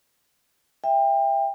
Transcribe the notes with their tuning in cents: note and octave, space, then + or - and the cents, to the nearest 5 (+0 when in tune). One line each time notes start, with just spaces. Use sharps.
E5 +0 G5 +25